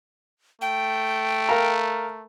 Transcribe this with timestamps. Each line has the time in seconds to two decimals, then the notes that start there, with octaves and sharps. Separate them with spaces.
0.62 A3 G5
1.49 A#4 F5 A#5